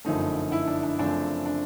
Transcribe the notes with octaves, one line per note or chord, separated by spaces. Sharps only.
G1 F#2 D3 F3 A3 D#4
E4
D4
D4
F#2 C#3 F3 A3 C4 D4
D4